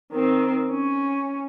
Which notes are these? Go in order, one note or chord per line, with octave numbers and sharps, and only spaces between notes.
D#3 C4
C#4